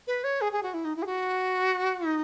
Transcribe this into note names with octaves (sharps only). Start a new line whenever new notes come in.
B4
C#5
G#4
G#4
F#4
E4
D#4
E4
G#4
F#4
D#4